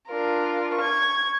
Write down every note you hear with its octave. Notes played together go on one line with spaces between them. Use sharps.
D4 F4 A#4
C#6 G#6